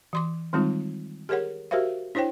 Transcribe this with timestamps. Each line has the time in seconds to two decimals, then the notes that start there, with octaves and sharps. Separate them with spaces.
0.13 E3 C6 D6
0.53 D#3 G3 G#3 C4 D#4 F4
1.29 G4 G#4 A#4 C#5 F#5
1.71 F#4 G4 A#4 C5 E5 F5
2.15 D4 E4 C5 C#5 G5